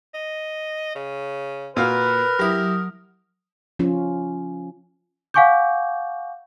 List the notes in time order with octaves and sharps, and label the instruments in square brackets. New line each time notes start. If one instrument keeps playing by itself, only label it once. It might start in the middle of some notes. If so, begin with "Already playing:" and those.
[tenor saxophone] D#5
C#3
[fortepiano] A#2 F#4 F5 [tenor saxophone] A#4 [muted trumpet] B4
[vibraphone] F#3 D#6 [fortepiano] E4 G4
[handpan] F3 C#4 F4
[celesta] F5 F#5 G#5 C#6 D6 G6